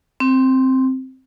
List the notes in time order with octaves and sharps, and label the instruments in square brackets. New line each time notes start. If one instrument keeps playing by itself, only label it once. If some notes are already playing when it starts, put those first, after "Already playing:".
[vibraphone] C4